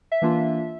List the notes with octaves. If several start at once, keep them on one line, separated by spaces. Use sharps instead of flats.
E5
E3 A#3 D4 F4